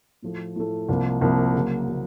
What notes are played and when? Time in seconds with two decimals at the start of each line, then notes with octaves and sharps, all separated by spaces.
0.22 A2 F3 A3
0.56 A2 F3 A3
0.89 C2 C3 F3 A#3
1.21 C2 C3 F3 A#3
1.54 C#3 F#3 A#3
1.88 C#3 F#3 A#3